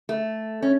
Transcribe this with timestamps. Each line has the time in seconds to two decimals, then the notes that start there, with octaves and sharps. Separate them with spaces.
0.09 A3
0.62 C#4